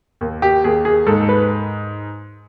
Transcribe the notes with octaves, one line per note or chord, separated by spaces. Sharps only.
D#2
G4
D#2 G#4
G#4
G#2 A4
B4